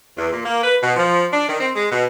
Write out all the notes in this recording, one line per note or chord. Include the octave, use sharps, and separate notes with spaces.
E2
A#2
A#3
B4
B2
F3
D4
D#3
C4
G#3
B2